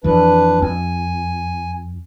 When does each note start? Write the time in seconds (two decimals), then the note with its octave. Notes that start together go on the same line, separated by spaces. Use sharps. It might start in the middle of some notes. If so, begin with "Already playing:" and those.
0.04 F2 E3 D4 B4
0.62 F2 G#5